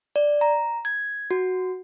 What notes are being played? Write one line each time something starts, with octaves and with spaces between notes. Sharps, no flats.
D5
A#5
G#6
F#4